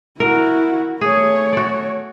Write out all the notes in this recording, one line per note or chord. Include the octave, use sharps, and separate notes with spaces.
E4 F#4 A#4
A3 G#4 C#5
F#4 D5